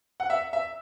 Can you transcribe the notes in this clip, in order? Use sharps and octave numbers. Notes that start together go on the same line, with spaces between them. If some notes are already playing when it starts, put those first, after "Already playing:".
F#5
E5
E5